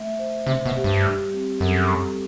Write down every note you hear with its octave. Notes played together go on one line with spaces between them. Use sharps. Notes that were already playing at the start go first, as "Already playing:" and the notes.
Already playing: A3 E5
C5
C3 C5
B2
G4
G2
G3
C4
F#2 A4
G3